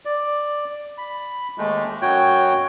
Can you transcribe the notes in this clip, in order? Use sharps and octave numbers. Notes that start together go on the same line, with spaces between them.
D5
B5
D#2 G#3 A3
F#2 F#4 C#5 G5 G6